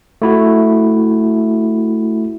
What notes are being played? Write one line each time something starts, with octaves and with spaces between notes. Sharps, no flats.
A3 E4 F#4